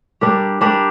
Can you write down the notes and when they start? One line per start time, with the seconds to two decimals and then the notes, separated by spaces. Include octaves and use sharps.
0.21 G3 D4 G4 A#4
0.61 G3 D4 G4 A#4